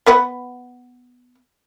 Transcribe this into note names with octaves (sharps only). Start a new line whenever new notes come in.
B3 B4 F#5